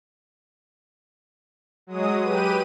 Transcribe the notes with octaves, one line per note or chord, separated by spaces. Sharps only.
F#3 G#3 D#6
G4 B4 D#7